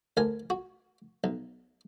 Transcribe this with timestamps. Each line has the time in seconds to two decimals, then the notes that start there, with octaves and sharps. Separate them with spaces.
0.17 D2 A#4 G#5
0.50 F#4
1.24 B1